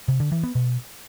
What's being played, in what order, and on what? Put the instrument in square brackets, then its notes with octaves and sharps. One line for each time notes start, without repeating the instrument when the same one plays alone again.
[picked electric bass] C3
D3
E3
B3
B2